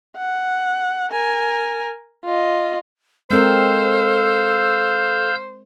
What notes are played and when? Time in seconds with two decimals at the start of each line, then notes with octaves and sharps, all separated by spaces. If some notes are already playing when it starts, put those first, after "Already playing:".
0.17 F#5
1.11 A#4 G#5
2.25 F4 D#5
3.31 G#3 C4 A4 A#4 C5 F5 E6 G6